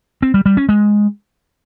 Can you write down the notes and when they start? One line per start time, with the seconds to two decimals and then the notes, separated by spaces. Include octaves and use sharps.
0.22 C4
0.34 G3
0.46 G3
0.57 C#4
0.69 G#3